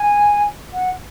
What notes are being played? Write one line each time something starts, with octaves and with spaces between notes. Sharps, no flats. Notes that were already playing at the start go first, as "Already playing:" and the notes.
Already playing: G#5
F#5